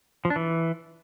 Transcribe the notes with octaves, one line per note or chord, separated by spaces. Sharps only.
F3
D4
E3